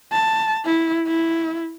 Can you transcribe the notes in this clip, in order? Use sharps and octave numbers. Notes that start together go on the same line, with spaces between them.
A5
E4
E4